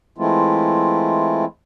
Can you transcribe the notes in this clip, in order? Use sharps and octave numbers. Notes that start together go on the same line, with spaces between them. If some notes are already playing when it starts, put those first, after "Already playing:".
E3 G#3 A3 C4 E4 F4